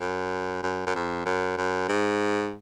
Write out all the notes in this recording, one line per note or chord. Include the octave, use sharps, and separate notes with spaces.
F#2
F#2
F#2
F2
F#2
F#2
G#2